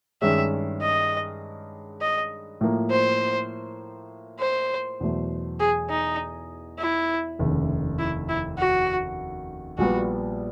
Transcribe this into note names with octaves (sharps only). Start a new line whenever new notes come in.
G2 D#3 G#3 C#4 E5
D#5
D#5
A2 F3 A#3
C5
C5
E2 B2 F#3 A3
G#4
D#4
E4
F1 D#2 C#3
E4
E4
F#4
A#1 A#2 G3 B3 F#4